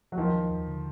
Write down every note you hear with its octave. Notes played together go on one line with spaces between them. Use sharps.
F#3
D#2 D#3 F3
G3
D#2
D3